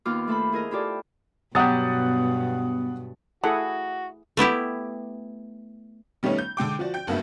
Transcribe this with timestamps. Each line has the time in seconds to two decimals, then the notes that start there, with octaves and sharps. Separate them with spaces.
0.05 D#2 B3 F4 D6 F6
0.27 A3 A4 C5 B5
0.52 E4 G#4 A#4 D#5
0.71 E4 F4 G4 A4 D5
1.55 G2 B2 F#3 B3 G4 F#5 D#6 A6
3.44 A3 E4 F#4 G#4 F#5
4.37 A3 B3 E4 G4
6.23 D#3 G3 A3 B3 C#4 D#4
6.39 G6
6.57 D3 G#3 G5 D6
6.79 F3 F#4 D5
6.94 G5 G6
7.07 F#1 G2 A#3 B3 F#4 E5